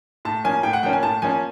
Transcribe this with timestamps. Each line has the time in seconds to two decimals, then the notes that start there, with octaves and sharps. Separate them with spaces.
0.25 A2 A5
0.44 F3 A#3 C#4 G#5
0.63 A2 G5
0.73 F#5
0.83 F3 A#3 C#4 G5
0.93 G#5
1.03 A2 A5
1.22 F3 A#3 C#4 G#5